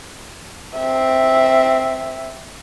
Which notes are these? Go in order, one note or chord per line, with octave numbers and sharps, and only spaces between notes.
C4 E5